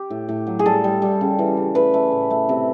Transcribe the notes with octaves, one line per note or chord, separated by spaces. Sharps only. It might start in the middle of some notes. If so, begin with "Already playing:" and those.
Already playing: G4
A2
A2
F#3
G#4
G3 A4
G3
G3
C#3
E3
C#3
A3 B4
A3
A2
A3
C3